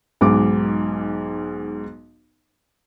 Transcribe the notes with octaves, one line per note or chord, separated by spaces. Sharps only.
B1 G#2 D6